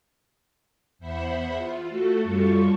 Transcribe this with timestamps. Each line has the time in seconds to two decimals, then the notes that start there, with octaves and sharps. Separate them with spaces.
0.99 E2 C5 E5 F#5 B5
1.58 F4
1.89 A3 F#4 A4
2.23 F#2 G3 F4 A4 C#6